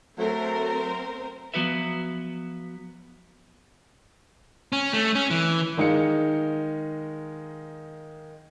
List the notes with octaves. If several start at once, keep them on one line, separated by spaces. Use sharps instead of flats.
F#3 A3 C4 A#4 C5
F3 F#3 B3 F#4 B4 E5
C#4
A3
C#4
E3
D#3 G#3 D#4 F5 C#7